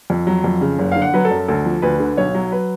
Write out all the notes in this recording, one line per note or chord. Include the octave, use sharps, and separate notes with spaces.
F2
F#3
F2
C#3
F#1
D3 F5
F#5
F#3 B4
A4
F#2
D2 A4
F3
D2 B4
D3
B1 C#5
F#3
B4